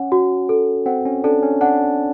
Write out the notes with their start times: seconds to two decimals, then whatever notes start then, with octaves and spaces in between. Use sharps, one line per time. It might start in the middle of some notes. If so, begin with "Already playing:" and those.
Already playing: C#4 F#5
0.12 F#4
0.49 A4
0.86 C4 F#5
1.05 C#4
1.24 D4 A4
1.43 C#4
1.61 D4 F#5